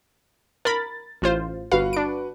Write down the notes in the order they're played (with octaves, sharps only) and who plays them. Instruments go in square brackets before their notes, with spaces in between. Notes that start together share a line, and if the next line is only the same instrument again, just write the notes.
[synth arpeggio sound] A#4 B5 [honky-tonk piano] A6
[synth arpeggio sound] A1 F4 C5
[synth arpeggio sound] G1 F5 [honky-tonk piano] F#4 B4
[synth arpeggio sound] D4 D7